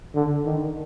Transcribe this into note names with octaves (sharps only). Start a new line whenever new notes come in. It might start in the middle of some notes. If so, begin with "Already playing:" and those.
D3
D#3